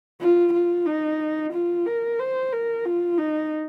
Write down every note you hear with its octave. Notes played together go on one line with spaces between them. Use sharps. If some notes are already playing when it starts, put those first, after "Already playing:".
F4
F4
D#4
F4
A#4
C5
A#4
F4
D#4